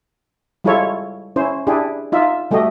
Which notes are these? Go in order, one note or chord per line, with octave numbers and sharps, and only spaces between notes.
G3 G#3 E4 F4 A4 C#5
C#4 E4 C5
D4 E4 G4 G#4
D#4 F4 E5
G3 A3 F#4 G4 D#5